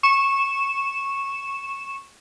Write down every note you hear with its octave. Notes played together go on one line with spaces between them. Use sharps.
C#6 E7